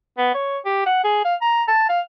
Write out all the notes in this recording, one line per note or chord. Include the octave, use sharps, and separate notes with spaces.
B3
C#5
G4
F#5
G#4
F5
A#5
A5
F5